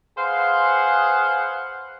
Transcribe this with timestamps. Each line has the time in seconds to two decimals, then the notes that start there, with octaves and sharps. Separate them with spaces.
0.18 G#4 B4 C5 F5 F#5